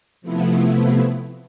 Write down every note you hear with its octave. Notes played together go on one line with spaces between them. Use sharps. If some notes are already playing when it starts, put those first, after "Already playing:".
C3 F3 A3 B3 E4